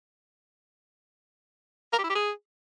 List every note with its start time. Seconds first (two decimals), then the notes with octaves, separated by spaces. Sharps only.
1.93 A#4
1.98 G4
2.04 E4
2.09 G4
2.15 G#4